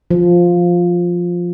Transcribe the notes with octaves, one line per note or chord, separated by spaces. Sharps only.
F3